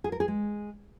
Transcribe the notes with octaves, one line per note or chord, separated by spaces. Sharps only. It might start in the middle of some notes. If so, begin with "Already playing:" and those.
G#4
A#4
G#4
G#3